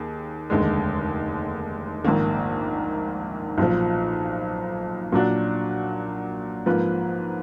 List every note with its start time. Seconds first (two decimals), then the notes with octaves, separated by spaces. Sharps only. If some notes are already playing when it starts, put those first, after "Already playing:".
Already playing: D#2 G#4
0.50 F1 D#2 D3 G#3
2.05 A#1 G#2 D#3 A#3
3.58 B1 A#2 F3
5.13 A#2 F#3 D4 F#4
6.66 G#2 F3 A#3 F4 B4